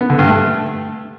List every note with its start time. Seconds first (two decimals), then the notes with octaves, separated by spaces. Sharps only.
0.01 B3
0.10 D3
0.19 G2
0.28 A3